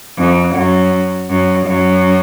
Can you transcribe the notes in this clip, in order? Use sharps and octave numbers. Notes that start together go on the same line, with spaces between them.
F2
F#2
F#2
F#2